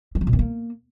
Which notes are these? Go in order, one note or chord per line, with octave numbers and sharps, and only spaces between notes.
G3
F#3
B2
G2
A#3